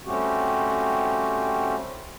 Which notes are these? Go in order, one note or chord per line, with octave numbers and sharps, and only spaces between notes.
G3 A3 C4 C#4 F#4 G4